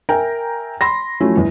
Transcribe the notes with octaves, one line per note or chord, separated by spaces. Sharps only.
A#4 E5 G5 G#5 A#5
B5 C6 A#6
F3 F#3 A3 C#4 E4
G1 E2